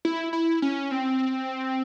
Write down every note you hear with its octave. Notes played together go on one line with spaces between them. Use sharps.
E4
E4
C#4
C4